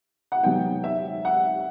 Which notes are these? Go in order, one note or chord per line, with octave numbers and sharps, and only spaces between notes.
F#5
C3 F#3 B3 D#4 G5
E5
F#5